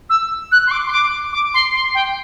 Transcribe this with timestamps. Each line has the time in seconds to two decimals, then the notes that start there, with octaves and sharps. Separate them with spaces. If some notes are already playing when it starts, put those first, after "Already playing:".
0.10 E6
0.52 F#6
0.67 C6
0.71 D6
0.87 C6
0.92 D6
1.33 D6
1.54 C6
1.74 C6
1.95 G5